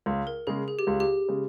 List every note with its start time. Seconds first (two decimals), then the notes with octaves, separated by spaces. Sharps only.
0.06 C#2
0.27 A#4
0.47 C#3 G#3 G#4
0.68 G#4
0.79 G4
0.87 C#2
1.00 G4
1.28 C#3 G#3